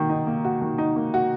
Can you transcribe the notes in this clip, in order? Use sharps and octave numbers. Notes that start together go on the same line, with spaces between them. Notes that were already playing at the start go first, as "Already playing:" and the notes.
Already playing: D#3 A#3 F#4
D#4
A#3
F#4
D#3
D#4
A#3
F#4